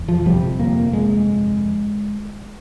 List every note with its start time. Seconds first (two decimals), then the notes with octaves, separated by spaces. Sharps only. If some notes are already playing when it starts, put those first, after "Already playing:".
Already playing: E1 E2
0.08 F3
0.26 G1 F2 C3 G3
0.59 A#3
0.93 G#3